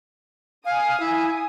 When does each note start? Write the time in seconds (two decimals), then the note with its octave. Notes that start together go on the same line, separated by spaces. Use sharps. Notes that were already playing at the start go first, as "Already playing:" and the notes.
0.65 F5 G#5 D#6
1.00 E4